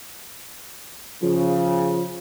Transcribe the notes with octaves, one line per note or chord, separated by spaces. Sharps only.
C#3 F3